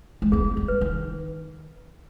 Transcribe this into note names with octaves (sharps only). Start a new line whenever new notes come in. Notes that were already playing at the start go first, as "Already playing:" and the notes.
G#3
B3 G#4
G3
B4
D#3